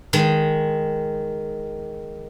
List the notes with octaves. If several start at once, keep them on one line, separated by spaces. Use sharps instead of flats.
D#3 G#3